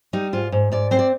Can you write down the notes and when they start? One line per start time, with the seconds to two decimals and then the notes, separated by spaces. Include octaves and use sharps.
0.13 G3 D#4
0.33 G#2 F4
0.52 G#2
0.72 G#2 D5
0.91 C4 C5
0.99 D5